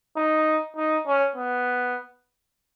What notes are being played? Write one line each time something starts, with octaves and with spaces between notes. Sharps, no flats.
D#4
D#4
C#4
B3